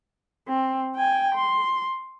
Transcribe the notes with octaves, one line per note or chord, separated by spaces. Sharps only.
C4
G5 G#5
C6